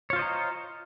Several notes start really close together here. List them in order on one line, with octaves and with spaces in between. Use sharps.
C#5 F4 C5 D#5 A#5